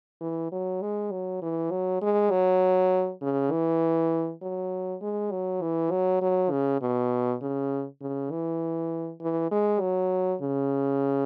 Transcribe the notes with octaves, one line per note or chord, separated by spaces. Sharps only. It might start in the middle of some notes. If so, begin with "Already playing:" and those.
E3
F#3
G#3
F#3
E3
F#3
G#3
F#3
C#3
E3
F#3
G#3
F#3
E3
F#3
F#3
C#3
B2
C#3
C#3
E3
E3
G#3
F#3
C#3